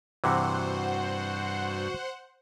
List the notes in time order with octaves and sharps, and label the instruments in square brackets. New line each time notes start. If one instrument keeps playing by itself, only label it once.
[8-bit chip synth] G2 [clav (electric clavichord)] C3 E3 [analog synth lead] F#4 [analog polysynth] C5 F#5